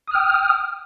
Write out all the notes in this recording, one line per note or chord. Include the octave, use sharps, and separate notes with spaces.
G5 D#6 F6